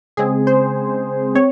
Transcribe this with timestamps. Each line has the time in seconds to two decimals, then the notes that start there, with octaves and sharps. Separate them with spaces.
0.17 C#3 G#3 C4 G#4
0.47 C5
1.35 C4 C#5